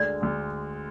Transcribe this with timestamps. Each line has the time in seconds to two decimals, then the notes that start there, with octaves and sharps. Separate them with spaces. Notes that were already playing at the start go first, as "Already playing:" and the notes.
Already playing: D2 D3 G#3 D5
0.21 D2 D3 G#3